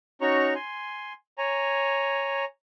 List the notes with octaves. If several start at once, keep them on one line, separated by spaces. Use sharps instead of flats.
C#4 D#4 F#4 C#5 A#5 C#6
G#5 C6
C#5 G#5 A#5